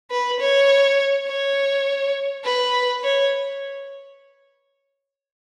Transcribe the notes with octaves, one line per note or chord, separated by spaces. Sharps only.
B4
C#5
C#5
B4
C#5